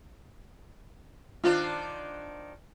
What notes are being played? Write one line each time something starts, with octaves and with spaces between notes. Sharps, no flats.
D#3 D4 F4 C5